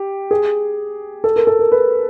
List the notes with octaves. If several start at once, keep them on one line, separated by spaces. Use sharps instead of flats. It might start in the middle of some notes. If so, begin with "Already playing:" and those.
Already playing: G4
G#4
A4
A#4
A4
A#4
B4